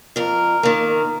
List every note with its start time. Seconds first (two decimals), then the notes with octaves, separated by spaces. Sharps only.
0.16 F2 A#4
0.63 D#3 A#3